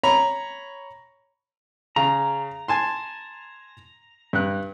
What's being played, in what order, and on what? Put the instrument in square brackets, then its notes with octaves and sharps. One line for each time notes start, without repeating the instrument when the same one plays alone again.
[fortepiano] C#5 A#5 B5
[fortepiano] C#3 [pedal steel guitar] A#5
[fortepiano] G#5 A5 C6
G2 F#6